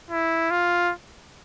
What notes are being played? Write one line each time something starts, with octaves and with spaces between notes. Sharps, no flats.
E4
F4